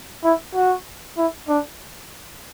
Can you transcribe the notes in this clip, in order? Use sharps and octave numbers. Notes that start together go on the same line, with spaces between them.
E4
F#4
E4
D4